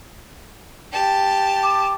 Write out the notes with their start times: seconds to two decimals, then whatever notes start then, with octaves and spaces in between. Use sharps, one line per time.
0.92 G4 A5
1.63 D6